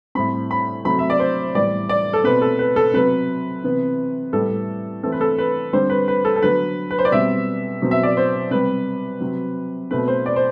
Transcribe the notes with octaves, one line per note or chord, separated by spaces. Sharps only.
A2 G3 C4 B5
B5
C3 F#3 A3 B5
E5
D5
C5
A2 E3 G3 B3 D5
D5
A4
B2 A3 C4 B4
A4
B4
A4
C3 F#3 B3 B4
C3 E3 B3
A2 G3 B3 A4
E3 A3 C4 A4
B4
A4
B4
D3 G3 C4 C5
B4
B4
A4
A4
D3 F#3 B3 B4
B4
C5
D5
B2 G3 C4 E5
B2 F#3 C4
E5
D5
C5
C3 G3 B3 B4
C3 F#3 C4
B2 A3 C4 B4
C5
D5
C5